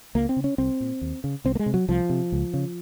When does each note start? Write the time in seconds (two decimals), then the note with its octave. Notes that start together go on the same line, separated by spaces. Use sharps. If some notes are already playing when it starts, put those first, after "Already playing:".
0.15 C#2 A#3
0.29 C4
0.36 C#3
0.44 C#4
0.58 C2 C4
0.80 A#2
1.01 D#2
1.24 C#3
1.45 C2 C4
1.55 A#3
1.59 G#3
1.66 C3
1.74 F#3
1.88 C2 F3
2.10 C3
2.32 C#2
2.54 C#3